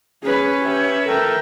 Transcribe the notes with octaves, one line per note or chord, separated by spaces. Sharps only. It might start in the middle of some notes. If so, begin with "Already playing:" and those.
C#4 G#4 B4
G4 B4 E5
A4 A#4 G5